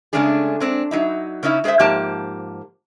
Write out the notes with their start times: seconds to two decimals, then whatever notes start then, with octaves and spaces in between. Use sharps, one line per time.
0.13 C#3 G#3 A3 C#4 D4 G#4
0.60 G#3 C4 D4
0.91 F#3 D#4 E4
1.43 C#3 C#4 D#4 E4
1.64 G#3 G#4 A4 C5 E5
1.79 G#2 F3 A#3 G4 A5 A#5